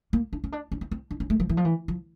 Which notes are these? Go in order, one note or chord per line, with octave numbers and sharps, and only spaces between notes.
A#3
D4
C#4
D4
C#4
C4
C4
D4
C#4
A3
F3
E3
F3
E3
F3